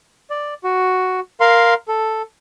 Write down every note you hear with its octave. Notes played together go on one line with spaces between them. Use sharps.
D5
F#4
A#4 F5 C6
A4